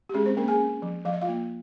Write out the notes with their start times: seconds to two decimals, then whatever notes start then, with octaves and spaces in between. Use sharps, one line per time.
0.09 G4
0.14 G#3 C#4 G#4
0.26 C4 C5
0.37 A#3 C#4 A#4
0.48 G#4 G#5
0.60 C#4
0.82 F3
1.05 F3 F5
1.13 D#5
1.21 F4 F5
1.28 A#3